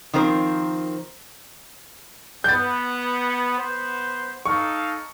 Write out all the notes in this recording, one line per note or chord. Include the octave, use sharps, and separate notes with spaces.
D#3 F3 C4 A#4 C5
B3 G6 A6
B3 C5
D#4 A4 F5 C#6